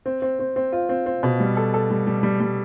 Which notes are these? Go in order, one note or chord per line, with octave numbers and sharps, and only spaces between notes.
C4
C4
C4
C4
F4
C4
C4
B2
G3
A4
A4
G3
G3
G3
G3